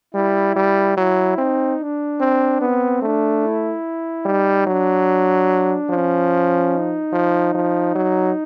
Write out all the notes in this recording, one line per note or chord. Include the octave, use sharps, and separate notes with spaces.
G3 E4
G3
F#3 E4
C4 D#4
D4
C4
B3 C4
A3 D4
E4
G3 D#4
F#3 D4
F3 C#4
D#4
F3
F3
F#3